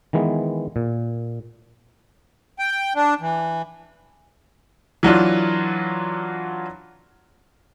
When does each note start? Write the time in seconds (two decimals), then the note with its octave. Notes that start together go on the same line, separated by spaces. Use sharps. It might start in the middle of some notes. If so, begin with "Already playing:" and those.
0.13 D#3 E3 G#3 B3
0.76 A#2
2.59 G5
2.95 D4
3.21 E3
5.03 E3 F#3 D4 F4